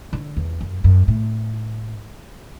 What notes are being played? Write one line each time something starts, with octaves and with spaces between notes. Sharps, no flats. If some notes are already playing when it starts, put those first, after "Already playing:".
D3
E2
F#2
F#2
A2